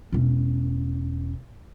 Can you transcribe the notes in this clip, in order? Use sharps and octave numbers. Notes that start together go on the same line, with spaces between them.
E1 C#4